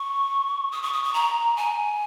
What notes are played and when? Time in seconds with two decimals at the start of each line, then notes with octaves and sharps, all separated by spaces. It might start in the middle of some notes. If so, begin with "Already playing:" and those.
Already playing: C#6
0.72 D#6
0.83 C#6
0.93 D#6
1.03 C#6
1.14 A#5
1.57 G#5